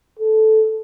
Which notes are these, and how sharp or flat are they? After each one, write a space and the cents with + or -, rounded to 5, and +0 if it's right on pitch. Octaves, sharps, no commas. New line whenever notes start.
A4 -10